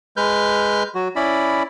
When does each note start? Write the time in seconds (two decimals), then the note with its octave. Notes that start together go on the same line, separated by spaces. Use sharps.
0.17 G#3 B4 F6 G6
0.95 F#3 F#4
1.16 C#4 E4 D5 B5